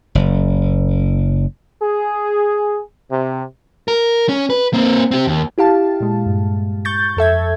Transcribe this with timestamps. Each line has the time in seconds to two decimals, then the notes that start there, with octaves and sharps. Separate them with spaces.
0.15 F#1
1.83 G#4
3.11 C3
3.88 A#4
4.29 C#4
4.50 B4
4.73 A#3 C4
5.11 C4 G4
5.27 D#2
5.58 E4 G4 F5 A5
6.00 A#2 G#3
6.26 G2
6.85 C#6 G6 A6
7.17 F2 A4 E5 G#6